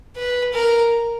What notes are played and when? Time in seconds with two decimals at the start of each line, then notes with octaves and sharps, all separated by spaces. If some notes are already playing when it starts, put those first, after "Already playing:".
0.16 B4
0.54 A#4